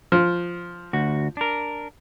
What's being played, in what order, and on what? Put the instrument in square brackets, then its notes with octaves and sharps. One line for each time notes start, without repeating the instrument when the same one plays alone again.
[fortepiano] F3
[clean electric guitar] D2 F#4
D4 A#4